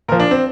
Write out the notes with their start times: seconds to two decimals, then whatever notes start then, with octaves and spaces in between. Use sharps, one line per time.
0.08 A#2 F3 A#4
0.20 D4
0.31 C4